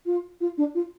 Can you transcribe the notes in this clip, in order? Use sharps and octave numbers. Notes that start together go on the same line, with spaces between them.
F4
F4
D4
F4